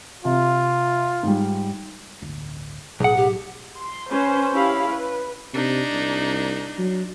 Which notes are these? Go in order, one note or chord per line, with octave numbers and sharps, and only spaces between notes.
C3 F4
G#2 G3
D1 G1
B1 A2 F#3 G#4 F#5
G4
C6
C#4 B4 C5
C#4 E4 G4 F5 B5
B4
C3 D4 D#4
C2
F#3